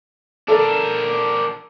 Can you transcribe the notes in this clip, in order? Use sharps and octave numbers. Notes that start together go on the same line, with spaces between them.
D4 A4 A#4 D5